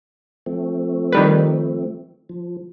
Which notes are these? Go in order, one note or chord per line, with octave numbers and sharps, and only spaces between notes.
F3 A3 C4
D#3 G3 B4
F3